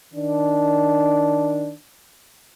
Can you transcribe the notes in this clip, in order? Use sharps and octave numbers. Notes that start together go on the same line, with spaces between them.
D#3 D4